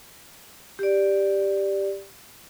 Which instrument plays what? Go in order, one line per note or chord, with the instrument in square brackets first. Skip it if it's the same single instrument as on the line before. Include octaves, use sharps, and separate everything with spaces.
[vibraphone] G4 D5